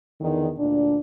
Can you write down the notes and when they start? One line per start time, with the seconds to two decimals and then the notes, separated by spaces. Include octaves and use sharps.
0.21 E2 D3 D#3
0.58 D2 A#2 D4